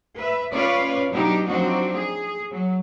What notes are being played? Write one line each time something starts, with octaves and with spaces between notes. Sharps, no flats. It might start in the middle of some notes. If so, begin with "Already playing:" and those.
B4 E5
C#4 F4 B4 C#5 D5 F5
B2 F#3 D4 D#4 G4
F3 F#3 C4 D4 D#4 F#4
G#4
F#3